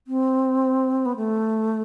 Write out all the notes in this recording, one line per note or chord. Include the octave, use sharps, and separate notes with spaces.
C4
B3
A3